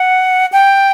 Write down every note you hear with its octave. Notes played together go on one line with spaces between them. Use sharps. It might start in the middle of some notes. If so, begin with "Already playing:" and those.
Already playing: F#5
G5